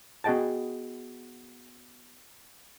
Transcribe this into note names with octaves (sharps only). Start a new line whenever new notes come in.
B3 F#4 G#4 D#5 G5 A5